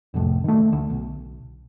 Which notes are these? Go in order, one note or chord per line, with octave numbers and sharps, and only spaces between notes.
F1 C2 F2 A2
D#3 A3
D2
B1